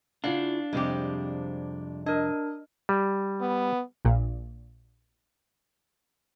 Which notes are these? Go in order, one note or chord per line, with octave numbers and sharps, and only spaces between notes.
C#3 D4 E4 F4 F5 F#5
F2 C3 G3 G#3 G4
D4 A#4 D#5
G3
B3
A#1 A#2